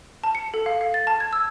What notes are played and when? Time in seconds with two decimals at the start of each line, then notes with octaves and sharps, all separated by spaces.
0.24 A5
0.35 C#7
0.54 A4
0.66 F5
0.81 F5
0.94 A6
1.07 A5
1.20 G#6
1.33 E6